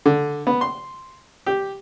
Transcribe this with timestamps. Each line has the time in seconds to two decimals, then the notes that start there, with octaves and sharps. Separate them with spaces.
0.06 D3
0.47 B3
0.61 C6
1.46 G4